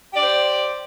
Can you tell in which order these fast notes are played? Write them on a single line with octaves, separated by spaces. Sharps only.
G4 D5 C5